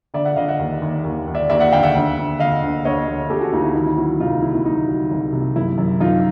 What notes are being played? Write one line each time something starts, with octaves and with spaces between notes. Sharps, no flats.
D3 D5 E5
E5 F#5
D3 D#5 F5
E5 F#5
D#2
D#2
D#2
D#2
D5 E5
D#2 D5 E5
E5 F#5
D3 F5 G5
E5 F#5
D2
D2
D3 D#5 F5
D2
D2 C#5 D#5
D3
D2 G4 A4
F#4 G#4
D2 D#4 F4
E4
D#3 D#4
E4
F#3 E4 F#4
C2 D#4 F4
C3 E4
E4
F#3 D#4
F#3
C2
C3
F#2 E4
F#2
F#2 D#4 F4